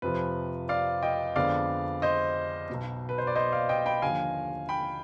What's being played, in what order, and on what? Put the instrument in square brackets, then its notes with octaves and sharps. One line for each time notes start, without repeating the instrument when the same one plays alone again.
[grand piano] F2 C3 F3 B4
D5 F5
D#5 G5
F2 D3 G#3 B3 D5 F5
C5 D#5
B1 B2 B3
B4
C5
D5
C5 D#5
D5 F5
D#5 G5
G5 B5
D#2 D3 F3 F5 G#5
G5 B5